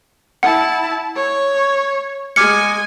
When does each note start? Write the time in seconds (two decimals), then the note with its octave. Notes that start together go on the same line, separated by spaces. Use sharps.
0.43 E4 F#5 A5
1.15 C#5
2.36 G#3 G#5 D6 F6 C#7